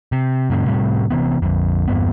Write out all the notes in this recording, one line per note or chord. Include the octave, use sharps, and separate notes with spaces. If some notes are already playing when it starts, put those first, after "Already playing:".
C3
F#2 A#2 C#3
A2 C3 G3
C3 E3 B3
A#1 F2
E2 G2 B3